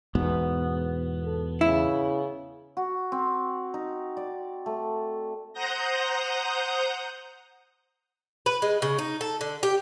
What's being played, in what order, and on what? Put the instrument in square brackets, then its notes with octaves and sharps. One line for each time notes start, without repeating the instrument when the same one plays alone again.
[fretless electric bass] E2 G#2 B2 [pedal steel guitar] B3
[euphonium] A4
[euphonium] C#3 [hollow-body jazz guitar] E4
[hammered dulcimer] F#4
C4
D#4
D5
A3
[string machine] C5 F#5 A#5 D#6 G6 A#6
[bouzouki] B4
G#3
C#3
D#4
A4
D3
G4